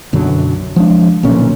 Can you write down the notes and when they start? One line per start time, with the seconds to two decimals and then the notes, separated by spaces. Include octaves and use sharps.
0.13 B1 F#2 D3 F#3
0.76 F3 G#3 D4
1.23 B1 A#2 D3 C#4